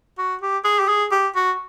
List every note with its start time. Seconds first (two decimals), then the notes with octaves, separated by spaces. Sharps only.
0.18 F#4
0.41 G4
0.64 G#4
0.80 G4
0.88 G#4
1.11 G4
1.36 F#4